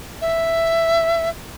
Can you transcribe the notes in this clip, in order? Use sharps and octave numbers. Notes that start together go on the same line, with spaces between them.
E5